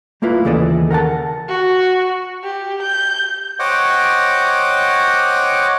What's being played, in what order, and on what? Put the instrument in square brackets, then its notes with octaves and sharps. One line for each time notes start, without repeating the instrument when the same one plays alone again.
[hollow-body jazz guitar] A3 A#3 E4 F4 B4
D#2 C#3 E3 A4 D5 D#5
A#4 F#5 G5 A5
[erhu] F#4
G4
G6
[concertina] C5 C#5 D#5 F#5 G5 D6